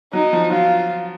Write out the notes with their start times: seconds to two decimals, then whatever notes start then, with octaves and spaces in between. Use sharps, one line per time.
0.13 F#3 D#4
0.33 F3
0.51 F#3 F4